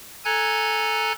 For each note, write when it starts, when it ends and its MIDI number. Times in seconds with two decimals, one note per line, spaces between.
0.25 1.12 69
0.25 1.12 80
0.25 1.12 82
0.25 1.12 90
0.25 1.12 92